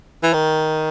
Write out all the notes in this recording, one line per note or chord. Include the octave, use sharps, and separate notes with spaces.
E3
D#3